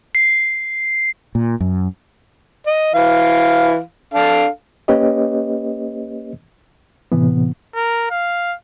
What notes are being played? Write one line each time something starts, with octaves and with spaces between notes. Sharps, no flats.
C7
A#2
F#2
D#5
E3 F5
D4 A4 F5
A#3 C#4 G4 B4 C#5 D#5
A2 C3 E3 B3
A#4
F5